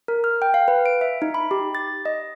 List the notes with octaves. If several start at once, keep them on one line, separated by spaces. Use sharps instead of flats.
A#4
F6
G5
F5
B4
D7
E5
D#4
B5
G4
A6
D#5